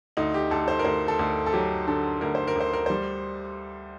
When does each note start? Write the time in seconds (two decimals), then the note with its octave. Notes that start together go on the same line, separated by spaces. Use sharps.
0.17 D2 D#4
0.34 G4
0.51 D2 A4
0.68 C5
0.79 A#4
0.85 D2 C5
1.08 A4
1.19 D2
1.46 A4
1.53 F#3 G4
1.87 D3 A4
2.21 D2 A#4
2.35 C5
2.47 A#4
2.56 D2 C5
2.73 A#4
2.86 G3 C5